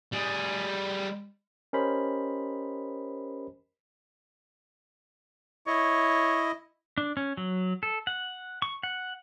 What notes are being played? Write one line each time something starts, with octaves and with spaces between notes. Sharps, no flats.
G3 G#4
C#4 G4 A#4 C5 D#5 B5
E4 C#5 D#5
D4
C#4
F#3
A4
F#5
C#6
F#5